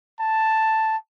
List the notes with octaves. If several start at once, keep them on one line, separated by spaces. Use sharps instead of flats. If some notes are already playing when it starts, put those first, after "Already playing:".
A5